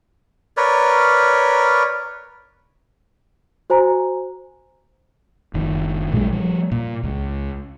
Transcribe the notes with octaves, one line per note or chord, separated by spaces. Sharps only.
A#4 B4 C#5 D5
F#4 C5 G#5 A#5
F#1 D#3
A#1 A#2 F#3 G#3
F3 G3
A#2
C#2